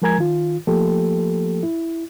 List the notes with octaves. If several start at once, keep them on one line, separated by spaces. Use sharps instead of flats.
F3 G#3 A#4 G#5 A#5 G#6
D#3 F4
F3 A3 A#3 G4 A4
E4